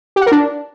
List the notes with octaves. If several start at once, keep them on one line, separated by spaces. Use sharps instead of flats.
G4
F#5
A#4
D4